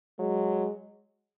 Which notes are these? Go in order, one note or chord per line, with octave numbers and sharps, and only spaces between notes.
F#3 G#3